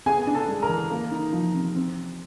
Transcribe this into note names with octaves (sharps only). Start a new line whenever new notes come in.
B3 G#4 G#5
D4
A4 A5
G#3
A#4 A#5
E3
A#3
D#4
F3
C3
C4